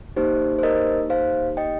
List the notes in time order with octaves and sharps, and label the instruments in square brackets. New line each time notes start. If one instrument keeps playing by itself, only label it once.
[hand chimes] A#3 D#4 G4 C5
C5
A#4 D#5
C5 F5
D#5 G5